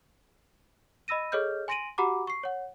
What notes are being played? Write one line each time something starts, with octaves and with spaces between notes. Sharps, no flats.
D#5 B5 E6 A#6 D#7
G#4 A4 C#5 D#5 F6 G6
G#5 C6 A#6 D7 D#7 F#7
F#4 G4 F#5 A#5 B5 D6
C#6 C7
C#5 F#5